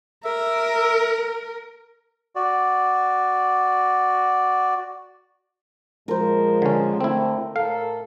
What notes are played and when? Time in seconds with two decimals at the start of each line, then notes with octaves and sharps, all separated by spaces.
0.25 A#4 E5
2.35 F#4 D5
6.08 A#2 F3 G#3 A#4 C5
6.62 D3 C#4
7.01 D3 A3 C4 E4
7.56 A2 A4 A#4 F5